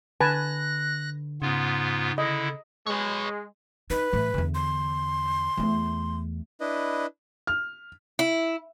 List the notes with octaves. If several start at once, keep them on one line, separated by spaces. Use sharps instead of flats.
D3 B4 G#5 A5 F#6 A#6
G#2 C#3 B3 F4
D3 E4 D#5
G#3 B4 C#5
D#4 B4
A2 E3
E2 D3
C6
E2 A3
D4 E4 B4 D#5
F6
E4